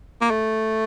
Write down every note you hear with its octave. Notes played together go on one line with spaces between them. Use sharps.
A#3
A3